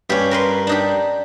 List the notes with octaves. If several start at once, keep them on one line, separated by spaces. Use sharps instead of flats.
G2 C#4 G4
A#4 B4 C6
D4 D#4 G4